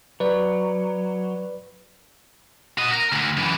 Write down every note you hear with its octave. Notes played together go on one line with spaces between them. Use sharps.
F#3 B4 D5
F#4 D#5
A#4
D2
F#2 E3